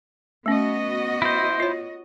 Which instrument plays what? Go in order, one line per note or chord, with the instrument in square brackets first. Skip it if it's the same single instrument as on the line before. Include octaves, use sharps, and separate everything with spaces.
[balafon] A3 C#4 [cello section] B3 F#4 D#5
[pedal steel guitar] E4 C5
[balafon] F4 C#5